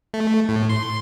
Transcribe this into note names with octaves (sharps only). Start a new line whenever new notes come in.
A3
A2
C6